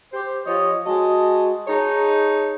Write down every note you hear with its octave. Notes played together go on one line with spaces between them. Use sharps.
G4 C5
F3 G4 C#5 D#5
G#3 F#4 D#5 A5
D#4 G#4 C#5 A5